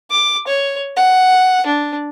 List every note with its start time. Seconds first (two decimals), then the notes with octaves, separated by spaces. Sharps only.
0.11 D6
0.47 C#5
0.96 F#5
1.66 D4